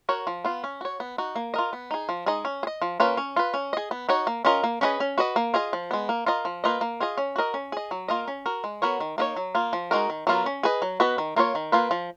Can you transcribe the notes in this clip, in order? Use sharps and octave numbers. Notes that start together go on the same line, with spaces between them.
F#4 A#4 C#5
F3
B3 F4
C#4
F#4 C#5
B3
D#4 F#4
A#3
F4 A#4 D#5
B3
D#4 G#4
F3
G#3 D#4 G#4 D#5
C#4
G#4
D#5
F3
A#3 C#4 F4 B4
C#4
F4 B4
C#4
G#4 D#5
B3
D#4 F#4 C#5
A#3
C#4 F4 A#4 D#5
A#3
C#4 G#4 B4 D#5
C#4
F#4 B4 D#5
A#3
F4 G#4 D#5
F3
G#3 B3
A#3
F4 A#4 D#5
F3
A#3 F4 B4 D#5
A#3
F4 G#4 D#5
C#4
F#4 A#4 D#5
C#4
G#4 D#5
F#3
A#3 F4 A#4 D#5
C#4
F#4 A#4
G#3
B3 F#4 A#4 C#5
D#3
A#3 D#4 A#4 C#5
F#3
A#3 F4
F3
G#3 D#4 F#4 A#4
D#3
F#3 B3 F4 A#4
C#4
G#4 B4 D#5
F#3
B3 F#4 B4 D#5
D#3
A#3 F4 A#4 C#5
D#3
A#3 F4 B4
F3